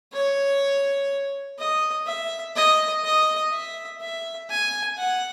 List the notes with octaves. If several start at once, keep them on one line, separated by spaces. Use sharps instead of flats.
C#5
D#5
E5
D#5
D#5
E5
E5
G#5
F#5